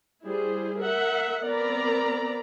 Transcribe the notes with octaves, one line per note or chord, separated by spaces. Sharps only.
G3 E4 G#4 C5
A#4 E5 F#5
B3 C4 A#4 D5 A#5 B5